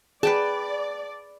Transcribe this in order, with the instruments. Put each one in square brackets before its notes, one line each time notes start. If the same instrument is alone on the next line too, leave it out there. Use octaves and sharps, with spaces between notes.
[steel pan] G#4 [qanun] B4 G5 A5 [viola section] D5